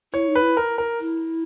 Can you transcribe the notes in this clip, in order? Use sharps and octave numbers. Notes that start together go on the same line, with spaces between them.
E4 C#5
D#4
B4
E4
A#4
A#4
E4